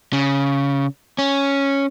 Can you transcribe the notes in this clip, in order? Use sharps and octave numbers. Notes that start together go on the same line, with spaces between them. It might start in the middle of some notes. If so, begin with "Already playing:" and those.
C#3
C#4